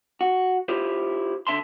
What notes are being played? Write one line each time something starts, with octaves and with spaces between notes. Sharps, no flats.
F#4
E4 F4 G4 C5
D3 E5 A5 C6